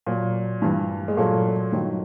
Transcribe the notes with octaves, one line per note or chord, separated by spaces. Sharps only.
A#2 F#3
G2 E3
G#3
A#2 F#3 A3
G2 D#3 F#3